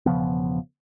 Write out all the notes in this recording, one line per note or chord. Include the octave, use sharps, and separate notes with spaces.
E1 C#3 F3 B3